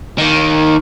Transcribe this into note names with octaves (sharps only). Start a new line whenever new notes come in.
D#3 A#3